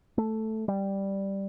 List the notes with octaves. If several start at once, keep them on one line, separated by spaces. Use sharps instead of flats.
A3
G3